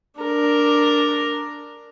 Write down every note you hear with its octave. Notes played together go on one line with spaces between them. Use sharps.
D4 A#4